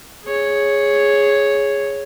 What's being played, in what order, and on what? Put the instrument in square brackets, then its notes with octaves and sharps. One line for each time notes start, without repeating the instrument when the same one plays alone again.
[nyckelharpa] G#4 C#5